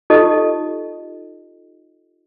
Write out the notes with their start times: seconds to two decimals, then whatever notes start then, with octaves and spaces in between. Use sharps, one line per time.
0.10 D#4 F4 G4 A4 D#5